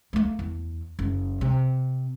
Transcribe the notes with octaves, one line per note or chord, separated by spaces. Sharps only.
A3 A#3
E2
F#1
C3